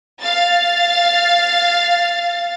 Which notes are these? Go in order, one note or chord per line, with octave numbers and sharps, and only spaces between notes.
F5 A6